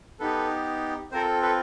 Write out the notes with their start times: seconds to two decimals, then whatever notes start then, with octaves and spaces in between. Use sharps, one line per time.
0.20 B3 D#4 G4 A4 B4
1.12 C4 F4 A4 A#4 C5
1.42 A4 B4